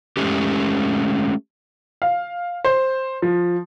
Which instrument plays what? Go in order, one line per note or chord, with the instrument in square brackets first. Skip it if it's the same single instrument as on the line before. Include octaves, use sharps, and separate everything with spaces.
[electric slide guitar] G#3 A3 C#4 G4
[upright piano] F5
C5
F3